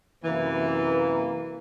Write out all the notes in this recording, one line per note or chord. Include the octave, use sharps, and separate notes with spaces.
F#2 C3 E3 A#3 B4